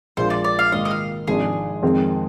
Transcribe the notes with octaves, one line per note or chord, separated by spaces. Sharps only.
A#1 A#2 G#3 D4 F4 C5
D5
D5
F5
G#2 D#3 A#3 F4 D#5
D#5
F5
G#1 G#2 F3 G#3 D4 G#4
F2 D#3 G#3 C4